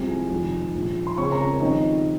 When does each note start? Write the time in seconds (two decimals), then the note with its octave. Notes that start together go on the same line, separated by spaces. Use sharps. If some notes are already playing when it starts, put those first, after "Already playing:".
Already playing: C2 C3 F3 G#3 C4 G#5
0.31 F1 F2 D#3
0.75 A#1 G#2 F3
1.07 C6
1.17 C#2 C#3 G#3 C4 C#5 C#6
1.32 A#4 A#5
1.46 C#4 C#5
1.60 F2 D#3 G3 C4 D#4 D#5